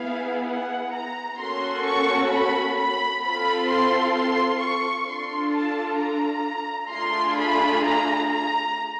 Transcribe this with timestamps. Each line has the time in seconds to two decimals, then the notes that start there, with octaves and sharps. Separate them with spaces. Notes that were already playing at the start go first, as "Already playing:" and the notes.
Already playing: B3 E4 G#4 F5
0.46 F#5
0.93 A#5
1.39 A#3 C#4 F#4 A4 C6
1.85 C#6
2.31 B5
2.78 B5
3.23 C4 F4 A4 B5
3.69 C6
4.15 C6
4.61 C#6
5.07 D4 F4 A4 C6
5.53 A5
6.00 A#5
6.91 A3 D4 F4 G#4 C6
7.37 B5
7.84 A#5
8.30 A#5